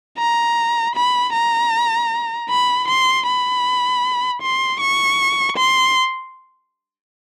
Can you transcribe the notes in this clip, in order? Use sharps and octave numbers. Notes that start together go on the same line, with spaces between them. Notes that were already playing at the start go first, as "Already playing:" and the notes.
A#5
B5
A#5
B5
C6
B5
C6
C#6
C6